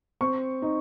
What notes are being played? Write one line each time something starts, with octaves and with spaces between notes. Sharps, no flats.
C4 C#6
D#4